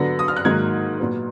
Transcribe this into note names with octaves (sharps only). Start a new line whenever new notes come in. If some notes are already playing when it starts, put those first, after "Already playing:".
Already playing: D3 F#3 B3 A#6
D#6
F6
F#6
G#2 D#3 F#3 A#3 G#6
A#2 F#3 B3